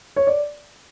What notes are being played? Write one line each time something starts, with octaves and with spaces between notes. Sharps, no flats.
C#5
D5